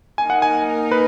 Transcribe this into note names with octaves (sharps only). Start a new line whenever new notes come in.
A#3 D#4 A#4 G#5
F#5
G#5
B4